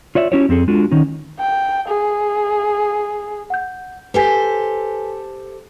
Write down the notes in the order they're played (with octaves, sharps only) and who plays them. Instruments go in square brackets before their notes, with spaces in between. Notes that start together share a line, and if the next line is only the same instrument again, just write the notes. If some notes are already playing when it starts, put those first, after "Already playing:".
[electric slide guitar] F4 C#5 D5 E5
C#4 E4 F#4 G4 C#5
F2 C4 G#4 A4
G#3 D4 F4 F#4 A4
D#3 C#4 D#4
[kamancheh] G5
G#4
[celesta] F#5 G6
[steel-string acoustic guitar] G4 A4 C5 [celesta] B4 G#5 B6